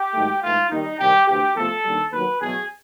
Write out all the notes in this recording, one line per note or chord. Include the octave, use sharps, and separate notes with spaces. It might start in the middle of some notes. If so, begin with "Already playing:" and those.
Already playing: G4
G#2 D#3 F#3 A3
G#2 E3 A3 F4
D#2 D#3 G3 D#4
C2 C3 D#3 G3 G4
D2 C3 E3 G4
E2 C3 F3 A3 A4
D#2 D3 G3
D#2 D#3 F#3 B4
E2 B2 F#3 A3 G#4